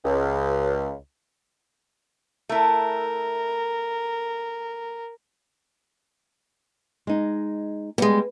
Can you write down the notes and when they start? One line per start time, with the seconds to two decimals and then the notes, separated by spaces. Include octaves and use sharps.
0.05 C#2
2.49 A3 E4 A#4
7.07 G#3 D#4
7.98 G3 G#3 B3